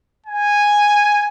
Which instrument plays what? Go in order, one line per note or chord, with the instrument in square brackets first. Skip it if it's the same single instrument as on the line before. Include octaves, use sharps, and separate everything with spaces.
[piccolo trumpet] G#5